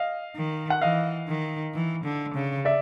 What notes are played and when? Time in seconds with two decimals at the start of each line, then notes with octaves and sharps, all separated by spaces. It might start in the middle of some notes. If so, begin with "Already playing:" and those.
Already playing: D#5 F5
0.36 D#3
0.70 F#5
0.82 E3 D#5 F5
1.28 D#3
1.74 E3
2.04 D3
2.34 C#3
2.65 D5 E5